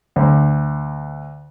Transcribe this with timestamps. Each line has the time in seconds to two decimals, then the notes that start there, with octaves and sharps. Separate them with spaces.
0.16 D2